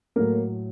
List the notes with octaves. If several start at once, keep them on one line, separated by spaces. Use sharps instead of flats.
A2 F#3 A3 A#3 A#4